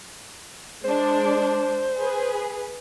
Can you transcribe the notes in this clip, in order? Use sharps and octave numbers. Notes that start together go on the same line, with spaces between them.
G#3 D4 C5
G#4 B4